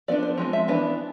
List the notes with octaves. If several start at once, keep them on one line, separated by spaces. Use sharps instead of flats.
F3 B3 D4 D5
C5
F3 G#3 C4
E5
E3 B3 D4